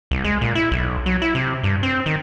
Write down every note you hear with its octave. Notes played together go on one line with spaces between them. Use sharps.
C2
G#3
A#2
E4
B1
F#3
E4
C3
G2
C4
D#3